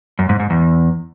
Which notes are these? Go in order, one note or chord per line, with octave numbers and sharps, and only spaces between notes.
F#2
G#2
G#2
E2